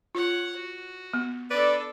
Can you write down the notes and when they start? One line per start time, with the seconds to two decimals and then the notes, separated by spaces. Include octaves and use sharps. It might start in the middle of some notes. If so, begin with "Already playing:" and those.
0.15 F4 C#5 F#5
0.56 F#4
1.14 B3
1.51 D4 A4 B4 D5